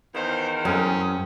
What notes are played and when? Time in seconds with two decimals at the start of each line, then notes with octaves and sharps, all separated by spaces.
0.15 E2 D#3 C5 F5 C6
0.65 F#2 C4 C#4 G#4 A4